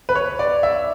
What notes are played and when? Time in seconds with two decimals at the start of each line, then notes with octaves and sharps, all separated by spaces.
0.09 B4
0.15 C#5
0.39 D5
0.63 E5